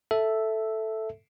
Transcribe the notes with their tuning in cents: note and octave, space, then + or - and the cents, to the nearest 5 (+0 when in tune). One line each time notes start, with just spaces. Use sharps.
A4 +0 E5 +0